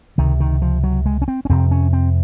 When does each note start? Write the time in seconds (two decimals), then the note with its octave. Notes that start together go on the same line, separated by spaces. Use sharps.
0.18 C#2 C3 D#3
0.40 D#3
0.62 F3
0.84 F#3
1.06 G#3
1.22 C#4
1.28 C4
1.45 C#4
1.49 F2 C3 C4
1.71 C#4
1.93 C4